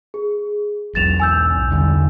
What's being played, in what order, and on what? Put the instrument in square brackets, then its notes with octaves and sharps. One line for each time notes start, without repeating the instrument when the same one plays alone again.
[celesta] G#4
[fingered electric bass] B1 E2 F#3 [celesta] A6 E7 F7
[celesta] G#5 E6 G6
[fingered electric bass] E2 D3 G3